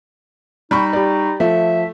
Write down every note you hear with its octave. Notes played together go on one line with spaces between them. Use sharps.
G3 D#4 B5 C#6
G4 D5
F3 A3 E5